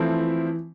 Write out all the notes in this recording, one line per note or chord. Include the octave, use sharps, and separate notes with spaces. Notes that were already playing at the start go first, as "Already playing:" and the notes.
Already playing: E3 F3 A3 C4 E4